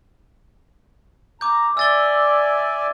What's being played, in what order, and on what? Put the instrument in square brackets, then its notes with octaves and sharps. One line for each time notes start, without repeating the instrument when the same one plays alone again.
[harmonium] A#5 [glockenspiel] D6 G6
[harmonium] D5 E5 G#5 [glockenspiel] E6 A6 G7